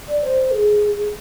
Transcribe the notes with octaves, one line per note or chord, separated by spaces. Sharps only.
D5
C5
G#4